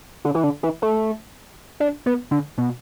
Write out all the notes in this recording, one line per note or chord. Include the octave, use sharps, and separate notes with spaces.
D3
E3
D3
E3
A3
D4
B3
D3
B2